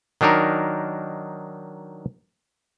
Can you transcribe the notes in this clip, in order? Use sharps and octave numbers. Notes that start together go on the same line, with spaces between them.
D#3 F#3 D4 D#4 A#4